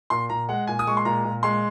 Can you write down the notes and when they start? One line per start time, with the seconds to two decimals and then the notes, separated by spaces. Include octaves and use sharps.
0.10 A#2 C6
0.30 A#2 A#5
0.49 G#3 F#5
0.67 A#2 G#5
0.79 D#6
0.87 G#3 C#6
0.97 C6
1.05 A#2 A#5
1.24 A#2
1.43 G#3 C6